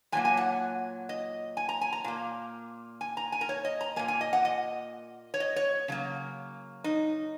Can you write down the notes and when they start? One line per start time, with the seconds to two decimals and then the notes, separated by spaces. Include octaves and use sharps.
0.12 A#2 F#3 A#3 G#5
0.25 G#5
0.37 F#5
1.09 D#5
1.57 G#5
1.69 A#5
1.81 G#5
1.92 A#5
2.04 A#2 A#3
3.01 G#5
3.17 A#5
3.32 G#5
3.41 A#4
3.49 C#5
3.65 D#5
3.81 A#5
3.96 A#2 A#3 G#5
4.08 G#5
4.21 D#5
4.33 F#5
4.45 D#5
5.34 C#5
5.40 D#5
5.56 C#5
5.88 C#3 F#3 A#3
6.84 D#4